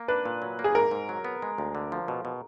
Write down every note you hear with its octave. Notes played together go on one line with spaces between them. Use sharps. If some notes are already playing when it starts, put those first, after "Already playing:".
Already playing: A#3
D4 B4
A#2
F#3
A#3
G#4
G#2 A#4
G#2
F#3
B3
G#3
D2
D3
F3
B2
B2